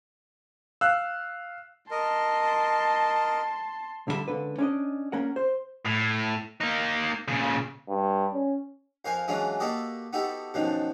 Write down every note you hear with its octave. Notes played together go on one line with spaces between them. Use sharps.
F5 E6 F#6
A#4 D#5 A5 C6
D2 D3 G3 F#4 E5
C#2 D3 B4
C#4 D4 D#5
A#3 C#4 A#4 F#5
C5
A2
A#3 D#4
A#2 C#3
G2
C#4
F2 A#4 C5 F5 G#5
E3 F#3 G#3 C#4 D4 F4
A#3 F#4 G4 A4 D5 D#5
B3 D#4 F#4 G4 A4
F#2 B2 D#3 F3 D4